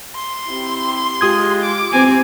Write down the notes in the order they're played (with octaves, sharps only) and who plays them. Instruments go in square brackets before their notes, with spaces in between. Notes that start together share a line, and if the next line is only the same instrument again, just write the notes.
[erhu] C6
[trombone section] C4 E4 G4
[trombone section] G#3 F4 [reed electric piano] G4 D#6 G#6
[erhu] D6
[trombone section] E3 [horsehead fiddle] C4 G#5